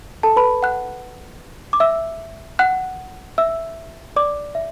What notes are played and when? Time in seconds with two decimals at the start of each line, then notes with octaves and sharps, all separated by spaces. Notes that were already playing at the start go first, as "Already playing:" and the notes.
0.23 A4 A5
0.36 B4 B5
0.63 F#5 F#6
1.73 D6
1.80 E5 E6
2.59 F#5 F#6
3.38 E5 E6
4.16 D5 D6
4.55 E5